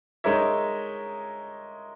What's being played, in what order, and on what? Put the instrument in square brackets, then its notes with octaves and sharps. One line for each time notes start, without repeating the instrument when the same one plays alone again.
[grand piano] G#3 D#4 A#4 C#5 E5